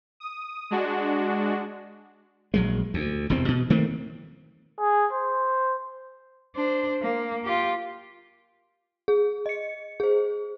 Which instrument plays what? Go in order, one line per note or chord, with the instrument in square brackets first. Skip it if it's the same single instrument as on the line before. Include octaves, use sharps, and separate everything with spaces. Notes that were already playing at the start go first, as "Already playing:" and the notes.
[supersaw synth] D#6
G#3 D4 F#4
[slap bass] A#1 F#3 G#3
D2
E1 E2 C3 C4
B2
D#3 A3 A#3 C4
[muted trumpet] G#4
C5
[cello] D4 C5
A#3
F4 G4
[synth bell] G#4
D#5 C#7
G#4 C5